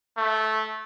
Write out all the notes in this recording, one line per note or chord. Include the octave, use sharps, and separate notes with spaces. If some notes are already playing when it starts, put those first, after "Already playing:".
A3